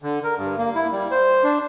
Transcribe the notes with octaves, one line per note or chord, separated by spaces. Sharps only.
D3
A#4
G2
A#3
E4
G3
C5
D4